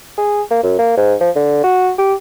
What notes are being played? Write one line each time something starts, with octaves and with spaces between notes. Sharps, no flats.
G#4
A#3
F#2
A#3
G#2
F3
D3
F#4
G4